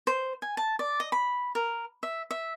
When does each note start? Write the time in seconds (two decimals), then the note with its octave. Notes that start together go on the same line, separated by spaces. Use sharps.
0.07 C5
0.42 G#5
0.57 A5
0.79 D5
1.00 D#5
1.12 B5
1.55 A#4
2.03 E5
2.31 E5